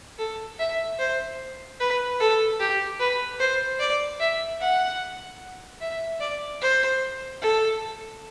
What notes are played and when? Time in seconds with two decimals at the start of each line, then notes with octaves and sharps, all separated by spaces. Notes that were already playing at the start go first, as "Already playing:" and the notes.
0.18 A4
0.59 E5
0.99 C5
1.80 B4
2.20 A4
2.60 G4
3.00 B4
3.39 C5
3.79 D5
4.20 E5
4.60 F#5
5.81 E5
6.20 D5
6.62 C5
7.42 A4